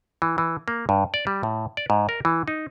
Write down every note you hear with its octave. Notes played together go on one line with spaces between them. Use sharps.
E3
E3
A#3
G2
D5
G3
A2
D5
G#2
A#4
E3
D#4